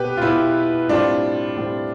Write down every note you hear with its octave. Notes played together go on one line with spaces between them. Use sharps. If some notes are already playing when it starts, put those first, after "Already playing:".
Already playing: B2 B3 G4 B4
F4
B2 B3 E4 G4
A2 G3 C4 D4 F4
A2 G3 C4